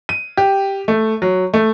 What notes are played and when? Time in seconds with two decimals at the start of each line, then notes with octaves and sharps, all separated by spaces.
0.09 D#7
0.37 G4
0.88 A3
1.22 F#3
1.54 A3